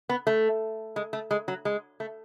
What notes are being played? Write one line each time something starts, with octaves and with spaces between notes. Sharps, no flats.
B3
A3
G#3
A3
G#3
F#3
G#3
A3